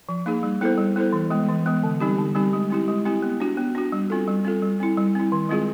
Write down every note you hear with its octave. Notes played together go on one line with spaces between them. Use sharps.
F3
A#3 D#4 G#4
G3
B3 E4 A4 C5
G3
B3 E4 A4 C5
E3
G#3 B3
E3
G#3 B3
D3
G3 C4 D#4 G4
D3
G3 C4 D#4 G4
G#3
C4 E4 G4
G#3
C4 E4 G4
B3
D4 F#4
B3
D4 F#4
G3
C4 F4 A4
G3
C4 F4 A4
G3
C4 E4
G3
C4 E4
D#3
G#3 C4 F4 G#4